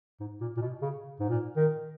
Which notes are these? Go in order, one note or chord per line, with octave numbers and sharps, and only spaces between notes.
G#2
A#2
A#2
B2
C#3
G#2
A#2
D#3